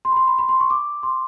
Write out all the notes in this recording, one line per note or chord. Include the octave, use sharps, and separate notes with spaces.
C6
B5
C6
B5
B5
C6
C#6
D6
C6